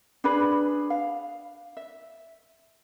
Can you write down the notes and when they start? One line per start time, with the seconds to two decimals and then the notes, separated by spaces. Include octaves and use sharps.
0.24 D4 G#4 B4 B5
0.90 F5
1.77 E5